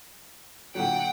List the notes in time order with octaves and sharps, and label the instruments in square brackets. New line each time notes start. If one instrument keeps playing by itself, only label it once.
[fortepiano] A#2 D3 F#3 [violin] F#5 G5